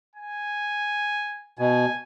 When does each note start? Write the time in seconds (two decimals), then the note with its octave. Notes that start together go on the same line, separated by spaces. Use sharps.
0.16 G#5
1.59 B2 G#5